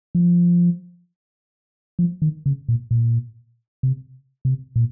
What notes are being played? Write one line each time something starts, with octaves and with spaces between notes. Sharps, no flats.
F3
F3
D#3
C#3
A#2
A#2
C3
C3
A#2